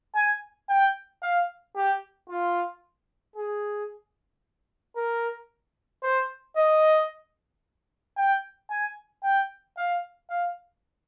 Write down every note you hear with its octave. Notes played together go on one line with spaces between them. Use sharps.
G#5
G5
F5
G4
F4
G#4
A#4
C5
D#5
G5
G#5
G5
F5
F5